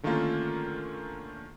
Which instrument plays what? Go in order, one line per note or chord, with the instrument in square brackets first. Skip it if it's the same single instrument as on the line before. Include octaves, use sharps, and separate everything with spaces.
[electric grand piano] D3 D#3 A3 A#3 C#4 F4